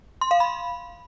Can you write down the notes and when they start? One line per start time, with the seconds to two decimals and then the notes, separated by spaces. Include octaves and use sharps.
0.21 C6
0.31 F5
0.40 B5